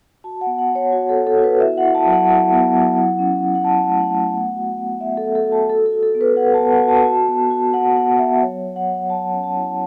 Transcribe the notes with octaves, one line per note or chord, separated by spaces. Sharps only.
F#4 A5
F#5
B3
F#5
B3
C#5
F#4
A4
B3
A4
F#4
B4
E4 E5
F#5
E4
A5
F#3
F#5
E4
B3
F#3
E4
C#4
C#4
F#5
C#4 A5
A3
F#5
A3
B3
F#4
B3
B3 E5
A4
B3
A4
F#4
A5
F#4 A4
A4
F#4
A4
B3
B4
F#4 F#5
A5
B3
F#5
F#4
A5
F#4
B3
F#4
F#4 F#5
B3 F#5
B3 E5
F#3 C#5
F#3
F#5
F#3
F#3 A5
C#4
A5
E4